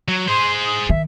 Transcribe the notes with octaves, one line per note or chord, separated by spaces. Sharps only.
F#3
G#4 C5 C6
D#6
D#3 E5